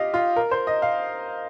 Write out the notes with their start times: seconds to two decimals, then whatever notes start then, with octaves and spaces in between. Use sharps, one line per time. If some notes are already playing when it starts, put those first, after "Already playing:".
Already playing: F4 G4 D#5 F5
0.14 F4
0.36 A#4
0.51 C5
0.67 D#5
0.82 F5